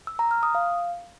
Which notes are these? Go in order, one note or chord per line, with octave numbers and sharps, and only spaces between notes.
E6
A#5
F6
D#6
F5